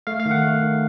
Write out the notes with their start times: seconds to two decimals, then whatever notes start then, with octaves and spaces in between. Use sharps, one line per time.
0.07 A3 F5
0.20 F5
0.26 D#3
0.31 F#5
0.44 A3
0.62 D#3